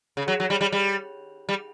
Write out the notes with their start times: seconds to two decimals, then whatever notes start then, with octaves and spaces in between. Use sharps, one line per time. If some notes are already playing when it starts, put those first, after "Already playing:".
0.17 C#3
0.28 F#3
0.40 F#3
0.50 G3
0.61 G3
0.72 G3
1.49 G3